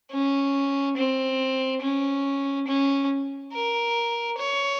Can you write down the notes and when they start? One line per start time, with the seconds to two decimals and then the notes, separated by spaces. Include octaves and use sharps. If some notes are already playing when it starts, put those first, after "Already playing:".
0.11 C#4
0.97 C4
1.82 C#4
2.67 C#4
3.53 A#4
4.38 C#5